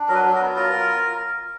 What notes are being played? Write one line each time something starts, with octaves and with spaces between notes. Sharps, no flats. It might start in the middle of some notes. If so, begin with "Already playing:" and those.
Already playing: D4
F#3 A#4
B4
F#3
A#4
B3
F4 A#4